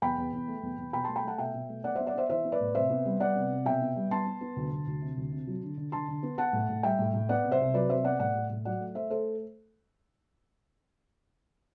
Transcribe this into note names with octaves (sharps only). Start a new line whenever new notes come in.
E2 G5 B5
E2
E2
A3
E2
E2
B2 G5 B5
A3 A5 C6
G5 B5
A3 F#5 A5
B2 E5 G5
B2
A3
B3 D5 F#5
B3 C5 E5
D5 F#5
B3 C5 E5
E3 C5 E5
B3
B4 D5
A2
C3 C5 E5
B3
G3
B3 D5 F#5
C3
C3
B2 E5 G5
B3
G3
B3 A5 C6
B3
B3
D2
D2
D2
C3
D2
C3
F#3
D3
D3
D3 A5 C6
D3
B3
B3 F#5 A5
A2
A2
G3 E5 G5
A2
A2
B3 D5 F#5
C3
C5 E5
C2
F#3 B4 D5
C3 C5 E5
B3 D5 F#5
A2 D5 F#5
A2
A2
F#3 D5 F#5
A3
A3 C5 E5
A3 A4 C5